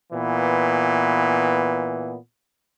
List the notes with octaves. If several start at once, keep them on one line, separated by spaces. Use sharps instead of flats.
A#2 E3 B3